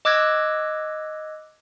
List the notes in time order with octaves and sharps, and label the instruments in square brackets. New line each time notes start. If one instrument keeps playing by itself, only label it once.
[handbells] D#5 D6 E6 F#6 G#6 A#6